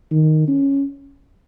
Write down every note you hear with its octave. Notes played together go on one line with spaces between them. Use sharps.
D#3
C#4